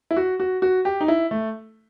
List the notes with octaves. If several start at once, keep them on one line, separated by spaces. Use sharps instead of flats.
E4
F#4
F#4
F#4
G4
D#4
E4
A3